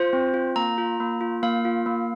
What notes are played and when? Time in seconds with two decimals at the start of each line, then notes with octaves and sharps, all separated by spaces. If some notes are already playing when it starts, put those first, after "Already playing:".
Already playing: F4 C5
0.13 C4
0.34 F4
0.56 A#3 A#5
0.78 F4
1.00 A#3
1.21 F4
1.43 A#3 F5
1.65 F4
1.86 A#3